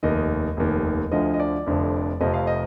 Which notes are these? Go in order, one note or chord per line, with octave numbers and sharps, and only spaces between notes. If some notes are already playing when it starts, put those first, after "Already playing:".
F1 D#2 D#3 D#5
F1 D#2 D#3
D2 D3 F3 D#5
D#5
D5
F1 F2 D3 F3
F1 F2 C3 F3 D#5
F5
D#5